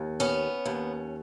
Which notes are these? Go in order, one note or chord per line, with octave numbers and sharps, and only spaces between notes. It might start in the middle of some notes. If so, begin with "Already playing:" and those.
Already playing: D#2
B3 C#4
D#2